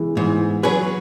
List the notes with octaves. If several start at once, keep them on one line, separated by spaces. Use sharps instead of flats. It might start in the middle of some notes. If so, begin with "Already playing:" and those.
Already playing: E3 G#3 B3
G#2 E3
F#3 C#4 G#4 B4